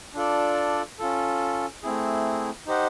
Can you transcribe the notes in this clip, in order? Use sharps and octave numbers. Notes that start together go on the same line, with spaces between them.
D4 F4 A4 D5
C#4 F4 A4
A3 C4 E4 G#4
D#4 G4 C5 D#5 F#5